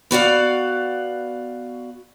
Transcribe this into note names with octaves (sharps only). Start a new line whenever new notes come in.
B3 F#4 D5 F5